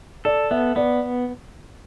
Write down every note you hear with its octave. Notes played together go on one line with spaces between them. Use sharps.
A4 D5
B3 E5
B3 D5